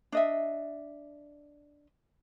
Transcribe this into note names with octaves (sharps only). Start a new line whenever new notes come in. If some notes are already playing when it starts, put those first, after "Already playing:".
D4 D#5 E5